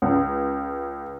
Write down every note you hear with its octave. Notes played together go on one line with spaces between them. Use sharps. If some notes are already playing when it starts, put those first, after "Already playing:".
C#2